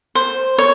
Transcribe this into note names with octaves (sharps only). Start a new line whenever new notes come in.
C5
C#5